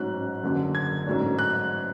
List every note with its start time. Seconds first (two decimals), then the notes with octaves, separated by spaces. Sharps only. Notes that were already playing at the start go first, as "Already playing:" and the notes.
Already playing: A1 G#2 F#3 C#4 F#6
0.43 F#1 F#2 D3 F#3
0.75 G#6
1.07 A1 G#2 F#3 A3 D4
1.39 F#6